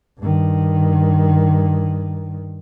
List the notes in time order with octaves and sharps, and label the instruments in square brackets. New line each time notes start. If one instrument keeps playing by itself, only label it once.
[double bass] G2 D#3